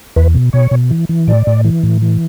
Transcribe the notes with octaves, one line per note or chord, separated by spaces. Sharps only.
E2 B4
B2
B2 C#5
B2
E3
E3
A2 D5
A2
E3
A2
E3